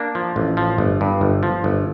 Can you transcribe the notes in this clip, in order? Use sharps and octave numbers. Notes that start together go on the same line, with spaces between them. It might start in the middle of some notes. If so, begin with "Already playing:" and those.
Already playing: A#3 D4
F3
A1
F3
G1
G2
G1
F3
G1